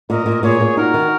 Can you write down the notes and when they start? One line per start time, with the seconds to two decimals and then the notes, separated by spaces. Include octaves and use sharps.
0.10 A#2 A#4 D#5
0.26 A#2
0.43 A#2 G#4 C#5
0.61 A#2
0.77 D#4 F#4 A#4
0.94 D#3